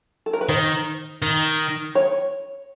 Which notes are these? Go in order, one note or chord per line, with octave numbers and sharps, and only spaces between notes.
A4
A#4
B4
D#3 C5
D#3
C#5